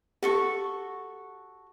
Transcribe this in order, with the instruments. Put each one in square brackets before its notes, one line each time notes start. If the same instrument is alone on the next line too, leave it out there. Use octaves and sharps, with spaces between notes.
[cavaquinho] F#4 A4 C#6 [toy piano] G4